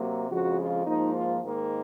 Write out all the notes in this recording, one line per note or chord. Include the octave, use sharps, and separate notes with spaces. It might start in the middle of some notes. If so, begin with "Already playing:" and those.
Already playing: C3 F#3 A#3
F2 C#3 F3 G#3 F#4
F4
G#2 F3 A#3 D#4
F4
G#2 D#3 A#3